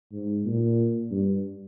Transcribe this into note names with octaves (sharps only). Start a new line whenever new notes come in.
G#2
A#2
G2